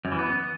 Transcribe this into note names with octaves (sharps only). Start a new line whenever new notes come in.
F#2
E3
B3